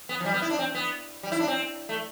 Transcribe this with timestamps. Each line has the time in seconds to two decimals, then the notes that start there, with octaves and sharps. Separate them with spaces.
0.09 B3
0.20 F3
0.26 G3
0.34 B3
0.42 E4
0.50 D4
0.59 C4
0.75 B3
1.23 G3
1.32 E4
1.40 D4
1.48 C4
1.89 A3